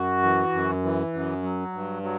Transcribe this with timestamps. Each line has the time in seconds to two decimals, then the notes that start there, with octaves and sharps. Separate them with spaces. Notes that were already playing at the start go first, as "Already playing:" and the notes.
Already playing: F#2 F#4
0.23 E3
0.52 F#2
0.83 E3
1.14 F#2
1.43 F#3
1.73 G2
2.03 F#3